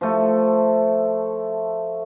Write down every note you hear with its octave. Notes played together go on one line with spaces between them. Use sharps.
F3 A3